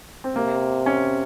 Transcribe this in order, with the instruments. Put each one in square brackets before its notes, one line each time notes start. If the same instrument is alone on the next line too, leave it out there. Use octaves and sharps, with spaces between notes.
[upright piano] C4
[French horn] C3 [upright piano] A#3
[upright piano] C#4